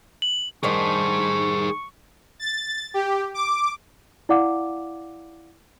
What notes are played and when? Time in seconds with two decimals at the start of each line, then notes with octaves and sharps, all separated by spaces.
0.22 F#7
0.63 D#3 G3 D4 G#4 C5 C#6
2.39 A6
2.94 G4
3.34 D6
4.29 E4 D5 F5 F#5 D6